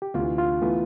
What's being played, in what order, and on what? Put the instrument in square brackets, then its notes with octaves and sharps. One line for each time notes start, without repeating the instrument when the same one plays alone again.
[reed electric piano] G4
[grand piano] D2 C3 E3 [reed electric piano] F4
[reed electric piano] F4
[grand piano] E3 B3 F4 [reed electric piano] A3